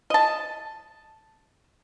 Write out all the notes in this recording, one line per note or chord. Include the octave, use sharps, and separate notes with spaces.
D#5 A5